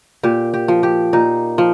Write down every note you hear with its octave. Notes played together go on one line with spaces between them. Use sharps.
A#2 G4
G4
F3
G4
A#2 D#4
F3